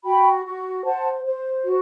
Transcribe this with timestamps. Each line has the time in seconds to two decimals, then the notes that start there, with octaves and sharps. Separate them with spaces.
0.05 F#4 G5 B5
0.45 F#4
0.85 C5 F#5 A5
1.24 C5
1.64 F#4